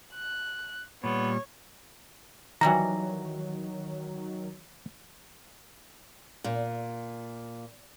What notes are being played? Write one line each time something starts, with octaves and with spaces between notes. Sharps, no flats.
F#6
A#2 G3 B3 C#5
D#3 E3 F#3 G3 F#4 A#5
A#2